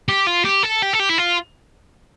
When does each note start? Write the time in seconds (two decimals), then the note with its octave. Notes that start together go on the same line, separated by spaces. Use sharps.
0.09 G4
0.27 F4
0.45 G4
0.63 A4
0.82 G4
0.93 A4
1.00 G4
1.09 E4
1.18 F4